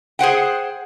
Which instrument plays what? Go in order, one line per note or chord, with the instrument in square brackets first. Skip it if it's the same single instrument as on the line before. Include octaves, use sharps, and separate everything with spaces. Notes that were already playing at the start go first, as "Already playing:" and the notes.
[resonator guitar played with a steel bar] G#4 C5 F#5 G5